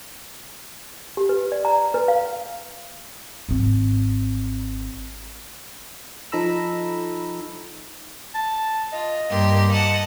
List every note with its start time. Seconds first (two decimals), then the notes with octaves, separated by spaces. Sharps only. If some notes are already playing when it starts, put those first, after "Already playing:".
1.17 G4
1.29 B4
1.52 D5
1.65 A#5
1.94 B4
2.08 F5
3.49 G#1 C4
6.32 F3 D#4 A4 A#5 B5 E6
8.35 A5
8.93 F4 D#5
9.30 G2 A#3 G4 G5 C6
9.71 D#5 F#5 A5